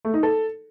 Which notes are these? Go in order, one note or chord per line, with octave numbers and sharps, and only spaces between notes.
A3
D#4
A4